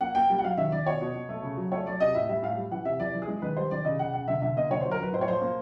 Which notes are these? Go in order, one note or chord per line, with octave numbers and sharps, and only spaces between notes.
A#3 F#5
A#3 G5
G3
F#5
F#3 F5
D#3 E5
D#3 D5
B2 C#5
B2
B2
A3
C#3
F#3
A3 C#5
F#3 D5
C3 D#5
A2 E5
G3 E5
A2 F5
G3
E3 F#5
C3 E5
E3 D5
E3
G#4
G#3
D#3 B4
G3 C5
D#3 D5
C#3 D#5
C#3 F#5
C#3 F#5
D3 E5
D3 E5
A#3 D#5
D3 C#5
F#3 C5
A#4
F#3 B4
A2 C5
C#5
F3 C5
A#3